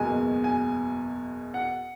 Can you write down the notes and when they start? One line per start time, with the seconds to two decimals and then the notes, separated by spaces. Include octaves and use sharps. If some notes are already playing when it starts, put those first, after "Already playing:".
Already playing: F#1 E2 B2 G#3 G#5
0.44 G#5
1.54 F#5